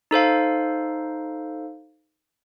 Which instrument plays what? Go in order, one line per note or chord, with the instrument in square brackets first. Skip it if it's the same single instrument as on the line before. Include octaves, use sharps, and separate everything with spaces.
[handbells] D#4 A4 C5 F5